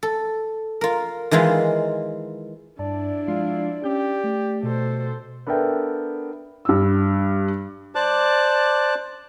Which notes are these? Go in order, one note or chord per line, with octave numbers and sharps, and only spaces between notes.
A4
F4 A#4
D#3 E3 G#3 E4 F4
G2 D4 E4 D5 A5
F3 G#3 F4 C7
C#4 G4 G6
A3
B2 A4 C5
B3 D4 A4 A#4 E5 G5
G2 E6
C5 D5 A5 D6 F#6